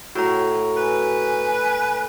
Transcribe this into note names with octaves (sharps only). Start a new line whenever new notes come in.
A2 F#4 A#5
B4 G#5